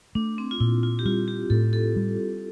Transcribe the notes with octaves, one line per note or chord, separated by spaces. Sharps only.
A3 D4
C4
F4
A#2 E4
F4
G4
G3 F4
G4
A2 A4
A4
G3